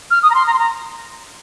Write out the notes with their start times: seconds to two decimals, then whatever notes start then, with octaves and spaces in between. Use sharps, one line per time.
0.11 F6
0.23 D#6
0.30 A#5
0.35 C6
0.47 A#5
0.54 C6
0.59 A#5